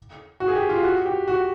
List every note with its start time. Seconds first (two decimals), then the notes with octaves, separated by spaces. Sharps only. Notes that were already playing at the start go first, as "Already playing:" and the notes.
0.40 F#4
0.48 G#4
0.55 G4
0.69 F4
0.83 F#4
1.05 G4
1.28 F#4